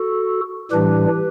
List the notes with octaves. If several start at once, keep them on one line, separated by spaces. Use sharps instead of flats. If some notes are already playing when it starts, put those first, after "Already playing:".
Already playing: F#4 A4
A2 E3 G3 D4 G4 B4